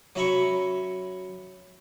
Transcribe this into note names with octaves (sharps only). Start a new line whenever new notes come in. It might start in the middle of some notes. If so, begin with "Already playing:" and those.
F#3 C#4 E5 A#5 B5 C#6